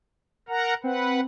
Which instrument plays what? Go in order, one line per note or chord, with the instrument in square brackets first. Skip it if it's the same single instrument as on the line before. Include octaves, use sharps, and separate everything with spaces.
[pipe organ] A#4 F#5 A#5
[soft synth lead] C4 [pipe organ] B4 F#5